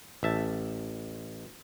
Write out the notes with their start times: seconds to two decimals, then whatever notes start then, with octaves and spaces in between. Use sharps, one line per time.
0.23 A1 E5 A5